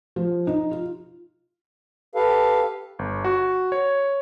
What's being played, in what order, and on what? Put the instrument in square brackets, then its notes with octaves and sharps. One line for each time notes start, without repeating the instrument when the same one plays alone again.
[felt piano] F3
D#4
F4
[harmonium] G4 A4 B4 F5
[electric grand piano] G1
F#4
C#5